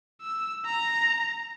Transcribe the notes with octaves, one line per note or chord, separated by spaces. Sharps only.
E6
A#5